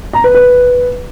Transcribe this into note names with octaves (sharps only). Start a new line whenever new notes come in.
A#5
B4
B4